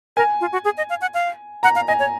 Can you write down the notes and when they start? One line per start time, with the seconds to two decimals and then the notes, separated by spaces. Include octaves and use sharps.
0.17 A#4 G#5
0.41 F4
0.53 F#4
0.65 G#4
0.77 D#5
0.90 F5
1.01 F#5
1.14 F5
1.63 F#5 A#5
1.76 F5
1.88 D#5 G#5
1.99 C#5